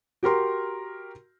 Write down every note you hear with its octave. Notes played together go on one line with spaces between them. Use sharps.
F#4 G4 A#4 C6